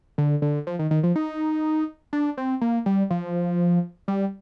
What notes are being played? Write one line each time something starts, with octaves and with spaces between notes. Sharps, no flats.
D3
D3
F3
D#3
D#3
F3
D#4
D4
C4
A#3
G3
F3
G3